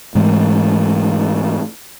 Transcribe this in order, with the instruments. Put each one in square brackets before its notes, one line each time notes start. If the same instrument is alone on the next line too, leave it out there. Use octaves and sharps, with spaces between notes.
[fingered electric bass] G#2 E3 G#3 A3